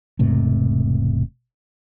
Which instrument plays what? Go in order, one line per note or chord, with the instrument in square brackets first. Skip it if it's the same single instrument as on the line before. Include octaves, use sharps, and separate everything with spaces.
[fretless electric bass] E1 G#2 C3 A3